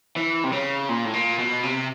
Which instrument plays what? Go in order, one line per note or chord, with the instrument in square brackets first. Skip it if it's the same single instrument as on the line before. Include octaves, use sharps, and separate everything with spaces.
[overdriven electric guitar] E3
C3
C#3
A#2
A2
A#2
B2
C3